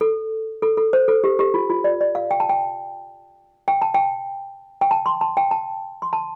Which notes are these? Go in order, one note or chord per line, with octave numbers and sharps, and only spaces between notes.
A4
A4
A4
C5
A4
G4
G4
F4
F4
D5
D5
F5
G5
A5
G5
G5
A5
G5
G5
A5
C6
A5
G5
A5
C6
A5